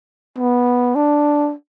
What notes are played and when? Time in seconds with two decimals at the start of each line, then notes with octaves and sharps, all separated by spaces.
0.38 B3
0.95 D4